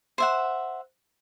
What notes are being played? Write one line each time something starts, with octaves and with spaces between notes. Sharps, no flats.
C5 E5 F#5